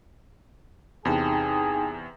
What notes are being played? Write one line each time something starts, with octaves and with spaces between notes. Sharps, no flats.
E2 C3 D#4 G#4 G5 A5